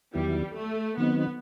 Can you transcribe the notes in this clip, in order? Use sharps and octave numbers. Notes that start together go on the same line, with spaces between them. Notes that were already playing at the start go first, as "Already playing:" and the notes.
E2 D#3 F#3 G3 B3 E4
A3
D#3 F#3 B3 C4 D#4